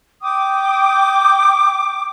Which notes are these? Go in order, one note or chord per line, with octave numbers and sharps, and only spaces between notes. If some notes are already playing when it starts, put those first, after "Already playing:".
G5 D6 D#6